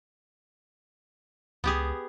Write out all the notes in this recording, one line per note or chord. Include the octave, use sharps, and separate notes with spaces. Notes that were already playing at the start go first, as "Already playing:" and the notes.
C#2 B3 G4 G#4